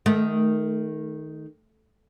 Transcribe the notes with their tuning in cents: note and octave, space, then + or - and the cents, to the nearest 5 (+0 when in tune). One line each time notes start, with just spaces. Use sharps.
D#3 +5 A3 -25